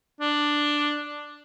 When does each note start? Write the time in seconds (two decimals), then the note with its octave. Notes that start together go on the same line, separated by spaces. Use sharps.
0.21 D4